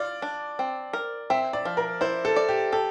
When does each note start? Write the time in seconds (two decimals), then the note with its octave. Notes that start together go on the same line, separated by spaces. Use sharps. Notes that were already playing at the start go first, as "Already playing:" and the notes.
Already playing: F4 D5
0.22 D4
0.59 C4
0.93 A#4
1.30 C4 E5
1.53 D5
1.65 F3
1.77 A#4
2.01 E4 C5
2.25 A4
2.36 D5
2.49 G4
2.72 G4 A4